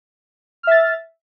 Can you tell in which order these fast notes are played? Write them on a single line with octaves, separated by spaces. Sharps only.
F6 E5 A6